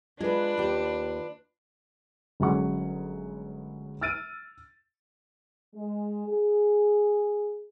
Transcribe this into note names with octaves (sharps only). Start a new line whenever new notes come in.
G#3 D4 F4 B4
D#2 G4
G1 F#3 G#3 C#4 F#5 C#6
E6 F6 A6 D7 D#7
G#3
G#4